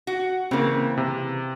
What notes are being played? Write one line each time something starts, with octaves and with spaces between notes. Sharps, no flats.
F#4
C#3 E3 A#3 C4
C3